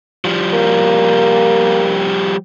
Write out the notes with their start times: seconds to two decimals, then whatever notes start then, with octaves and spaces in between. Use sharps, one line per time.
0.25 F3 G3
0.53 A#3